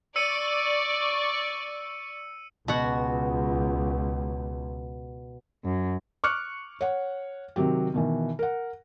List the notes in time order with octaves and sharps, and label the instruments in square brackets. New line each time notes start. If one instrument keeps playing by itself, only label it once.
[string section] D5 C#6 [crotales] E6 C#7 D#7
[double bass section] C#2 [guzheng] B2 F#4 F#5
[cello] F#2
[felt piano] C#6 D6 F6 F#6 C#7
C#5 F#5
C3 D#3 F#3 G4
B2 D#3 E3
A#4 F#5